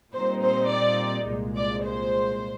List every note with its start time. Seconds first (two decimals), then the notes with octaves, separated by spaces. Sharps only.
0.13 A#2 G3 C4 D#4 C5
0.43 C5
0.70 D5
1.27 C2 A#2 G#3
1.56 D5
1.85 C5